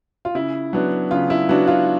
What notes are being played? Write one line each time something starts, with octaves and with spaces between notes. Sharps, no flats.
F4
C#3 E4
F#3 B3 D4
C#3 F4
E4
F#3 B3 D4 F#4
F4